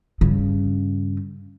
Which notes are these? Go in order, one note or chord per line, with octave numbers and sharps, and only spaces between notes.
G2 C#3